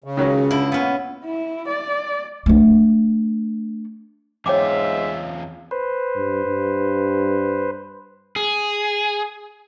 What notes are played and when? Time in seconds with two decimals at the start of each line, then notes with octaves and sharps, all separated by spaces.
0.04 C#3
0.17 C#2 D#3 F#3 C#4
0.51 D3 E4
0.72 A#2 B3 C#4
1.25 E4
1.68 D5
2.46 A3 D4
4.46 E2 G#2 F4 C#5 E5 G5 D6
5.71 B4 C5
6.16 G2
6.46 G2
8.36 G#4